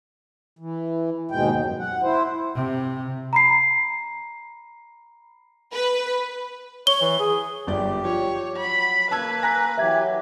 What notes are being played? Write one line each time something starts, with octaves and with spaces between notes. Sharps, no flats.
E3
D#2 G#2 B2 G#3 G5
F#2
F#5
E4 C5
C3
A#5 B5 C7
B4
C#5 G7
E3
G#4
G1 G4 D5
F3 C#5
F#3 B5
A#3 B4 A5 E6 G#6
G#5 A#5 F#6 A#6
E3 F#3 G4 E5 G#6